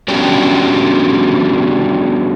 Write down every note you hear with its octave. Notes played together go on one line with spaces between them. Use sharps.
G3 B3 C#4 D4 F#4 G4